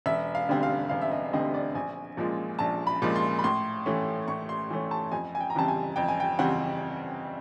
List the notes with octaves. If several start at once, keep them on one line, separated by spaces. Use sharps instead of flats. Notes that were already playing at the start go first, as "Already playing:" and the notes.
E1 E5
F5
D2 D3 G3 C4
F5
E1 F5
E5
D#5
D2 D3 G3 C4 D#5
D5
A#1 G#5
A#2 F3 G#3
A#1 A5
B5
A#2 F3 G#3
C6
B5
A2 C6
E3 A3 C#4
A2 C#6
C6
E3 A3 C#4
A5
F2 G#5
G#5
G5
A#5
C#3 E3 G3 C4 A5
G#5
F2 G5
G#5
G5
C#3 E3 G3 C4 F#5